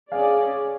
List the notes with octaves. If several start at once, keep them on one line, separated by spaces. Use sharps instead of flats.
C#4 G#4 D5 F5 G#5